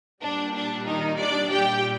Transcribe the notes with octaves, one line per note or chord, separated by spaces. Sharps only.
A#2 G3 D4
D4
D#3 D#4
D4 D5
A#2 G3 G4 G5